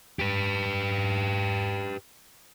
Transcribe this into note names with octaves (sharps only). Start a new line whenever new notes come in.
G4 B4